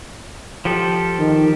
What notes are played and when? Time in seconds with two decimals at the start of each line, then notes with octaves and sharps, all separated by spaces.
0.65 F3 G4 A4
1.19 D#3